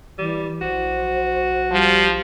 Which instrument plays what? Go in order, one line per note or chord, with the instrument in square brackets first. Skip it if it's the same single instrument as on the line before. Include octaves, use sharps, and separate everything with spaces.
[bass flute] E3 [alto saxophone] G3
[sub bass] A#1 [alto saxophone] F#4 [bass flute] C5
[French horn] F3 [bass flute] G3